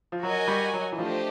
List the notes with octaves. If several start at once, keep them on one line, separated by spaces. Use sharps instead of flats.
F3
F#3 F#4 A#4 D#5 G#5
G3
F#3
E3
F3 A3 D4 G4 C5 D#5